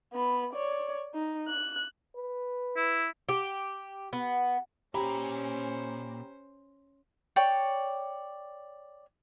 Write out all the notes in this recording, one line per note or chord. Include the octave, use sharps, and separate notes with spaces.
B3 B5
C#5 D5
D#4
F#6
B4
E4
G4
B3
A#2 C#4 G4 C5 A#5 B5
C#5 D5 G5